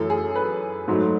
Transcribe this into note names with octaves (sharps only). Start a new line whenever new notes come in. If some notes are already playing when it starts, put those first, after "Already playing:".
Already playing: F#2 E3 A3 A4
G#4
B4
G#2 F#3 A3